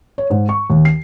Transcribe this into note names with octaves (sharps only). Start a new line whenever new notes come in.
C#5
G#2
C#6
D#2
C7